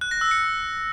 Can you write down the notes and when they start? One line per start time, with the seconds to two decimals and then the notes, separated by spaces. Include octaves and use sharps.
0.01 F#6
0.11 A#6
0.21 E6
0.31 C#7